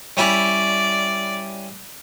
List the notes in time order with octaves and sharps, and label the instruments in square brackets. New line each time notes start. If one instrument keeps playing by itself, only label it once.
[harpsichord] G3 C#4 E4 [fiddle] D5